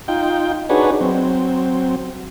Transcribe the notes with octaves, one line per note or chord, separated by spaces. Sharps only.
D#4 F4 G5
D4 D#4 F#4 G#4 B4 C#5
F#3 C4